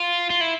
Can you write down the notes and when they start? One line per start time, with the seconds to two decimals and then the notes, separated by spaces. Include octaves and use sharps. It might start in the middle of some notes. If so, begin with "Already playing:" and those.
Already playing: F4
0.30 F4
0.41 E4